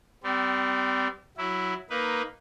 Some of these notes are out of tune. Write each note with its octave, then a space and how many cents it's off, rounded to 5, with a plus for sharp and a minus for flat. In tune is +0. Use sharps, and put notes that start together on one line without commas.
G3 -15 C4 -40
F#3 +0 E4 +0
A#3 +0 D#4 +5 B4 +0